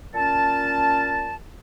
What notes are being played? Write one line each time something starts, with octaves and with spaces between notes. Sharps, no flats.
A#2 C#4 A5